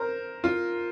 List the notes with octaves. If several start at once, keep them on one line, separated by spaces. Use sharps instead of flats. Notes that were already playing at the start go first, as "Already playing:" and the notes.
Already playing: A#4 C5
F4